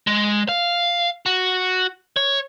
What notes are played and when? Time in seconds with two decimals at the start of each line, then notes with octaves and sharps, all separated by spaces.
0.07 G#3
0.49 F5
1.26 F#4
2.17 C#5